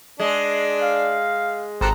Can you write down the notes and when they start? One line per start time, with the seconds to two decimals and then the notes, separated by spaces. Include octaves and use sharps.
0.20 G#3 D4 D5
0.82 F5
1.81 G#1 G4 A4 C5 A#5 F#6